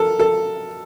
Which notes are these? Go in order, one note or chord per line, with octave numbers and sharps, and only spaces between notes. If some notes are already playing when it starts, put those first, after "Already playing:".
Already playing: A4 A#4
A4